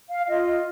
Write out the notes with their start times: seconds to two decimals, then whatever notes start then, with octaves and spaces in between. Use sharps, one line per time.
0.09 F5
0.28 F4 D#5